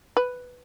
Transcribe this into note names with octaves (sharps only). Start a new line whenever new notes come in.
B4